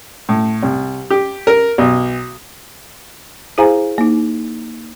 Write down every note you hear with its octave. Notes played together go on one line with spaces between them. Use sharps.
A2
C2
G4
A#4
B1
E4 G#4 C5 F5 G#5 A#5
A#3 D#4